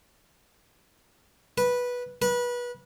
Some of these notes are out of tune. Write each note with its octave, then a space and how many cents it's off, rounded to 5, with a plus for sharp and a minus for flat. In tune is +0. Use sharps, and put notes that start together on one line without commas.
B4 -10
B4 -25